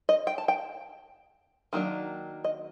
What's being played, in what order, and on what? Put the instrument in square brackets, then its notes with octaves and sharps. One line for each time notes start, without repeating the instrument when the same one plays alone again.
[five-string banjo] D#5
G5
A5
G5
D#3 F#3 A#3 D4
D#5